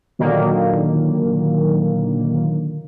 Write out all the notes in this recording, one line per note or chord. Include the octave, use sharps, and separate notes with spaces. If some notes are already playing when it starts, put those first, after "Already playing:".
A#2 D3 D#3 F#3 A#3